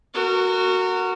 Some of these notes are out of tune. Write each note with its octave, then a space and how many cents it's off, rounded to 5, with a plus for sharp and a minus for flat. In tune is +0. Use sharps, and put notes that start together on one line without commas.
F#4 +0 A#4 -30